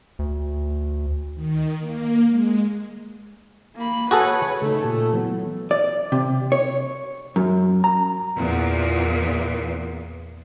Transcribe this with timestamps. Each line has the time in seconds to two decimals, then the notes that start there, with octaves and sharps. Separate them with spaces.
0.19 D2
1.35 D#3
1.78 A#3
2.29 G#3
3.76 A#3 B5
4.11 F#4 G#4 A4 B4 C#5
4.62 C#3 A3 D#4
4.83 A#2 G4 A5
5.13 E3 F#3 B3
5.71 D5
6.12 C3
6.52 C#5
7.36 F#2
7.84 A#5
8.37 E2 A#2